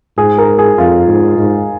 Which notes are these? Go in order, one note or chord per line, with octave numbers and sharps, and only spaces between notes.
G#2 G#4
A#4
G#4
F2 F4
G#2
G#2